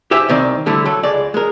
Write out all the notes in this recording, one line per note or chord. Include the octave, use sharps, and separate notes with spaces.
G4 C5 E5 G#5
C2 D#3 C4 D5
D3 G3 A3 E4
F#3 A4
C#2 G#3 D5
G#3 A#4